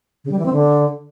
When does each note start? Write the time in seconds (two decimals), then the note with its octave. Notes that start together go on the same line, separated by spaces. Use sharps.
0.24 C#3
0.32 G3
0.39 E3
0.46 C4
0.53 D3